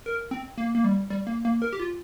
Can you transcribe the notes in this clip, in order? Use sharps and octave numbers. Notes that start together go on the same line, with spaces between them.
A#4
C4
A#3
A#3
G3
G3
A#3
A#3
A#4
G4
F4